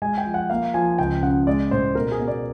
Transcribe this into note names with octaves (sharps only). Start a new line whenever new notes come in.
G#3 G#5
G5
F3
F#5
A#3 F5
F3 G#5
C#2 G5
C#3 F#5
G#3 D5
A2 C5
B2 A#4
G#4
B2
D5